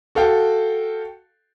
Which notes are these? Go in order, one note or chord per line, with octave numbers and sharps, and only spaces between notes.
F#4 A4 F5 G5